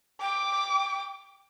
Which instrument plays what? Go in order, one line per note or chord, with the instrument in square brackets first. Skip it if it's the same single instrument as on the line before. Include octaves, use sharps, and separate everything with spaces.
[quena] G5 [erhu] D6